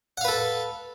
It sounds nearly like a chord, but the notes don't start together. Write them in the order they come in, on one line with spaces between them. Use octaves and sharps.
F#5 F5 B4 A4